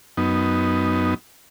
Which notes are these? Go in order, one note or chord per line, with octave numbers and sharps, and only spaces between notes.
F#2 B3 D#4